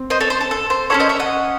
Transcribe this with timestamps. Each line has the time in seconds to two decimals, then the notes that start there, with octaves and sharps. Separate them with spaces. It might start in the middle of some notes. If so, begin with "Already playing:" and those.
Already playing: C4
0.10 C5 D#5
0.20 A4 C#5
0.30 C5
0.41 A4
0.51 A4
0.70 C5
0.90 C#4 E4 G#4 A4 C#5
1.00 C5 D#5
1.09 C#5 E5
1.19 D#5 F#5